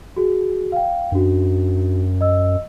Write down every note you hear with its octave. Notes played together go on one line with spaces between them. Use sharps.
F#4 G#4
F5 G5
F#2 D4 F#4
D#5 E6